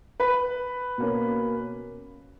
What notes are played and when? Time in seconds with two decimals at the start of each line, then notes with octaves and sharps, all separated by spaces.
0.20 B4 B5
0.98 B2 A#3 C#4